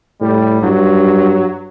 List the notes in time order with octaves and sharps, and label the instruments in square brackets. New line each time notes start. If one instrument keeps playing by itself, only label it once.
[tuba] A2 [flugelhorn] G3
[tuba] G2 [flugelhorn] F#3